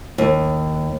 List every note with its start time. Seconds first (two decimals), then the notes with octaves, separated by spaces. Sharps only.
0.18 D#2